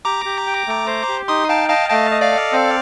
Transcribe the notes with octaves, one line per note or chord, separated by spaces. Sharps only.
G4 A#5 D6
G4
G5
A3
C5
G4
D#4 C6 D#6
F5 G5 A5
D#5 F5 A5
A3 F5 A5
D#5
D5 F5
A4
C4